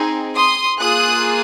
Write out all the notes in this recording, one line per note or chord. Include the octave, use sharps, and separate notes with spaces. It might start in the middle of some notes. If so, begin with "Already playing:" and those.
Already playing: C4 D#4 G#4
C6 D#6
A#3 F4 G#4 D#6 F#6